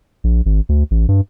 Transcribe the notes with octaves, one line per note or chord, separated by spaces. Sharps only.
A#1
G#1
D2
A1
G2